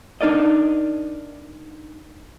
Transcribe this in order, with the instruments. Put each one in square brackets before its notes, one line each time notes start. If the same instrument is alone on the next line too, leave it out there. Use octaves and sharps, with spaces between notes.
[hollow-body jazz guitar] D4 D#4 A#4 D5 D#5